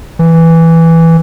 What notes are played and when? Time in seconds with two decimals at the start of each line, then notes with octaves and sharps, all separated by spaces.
0.19 E3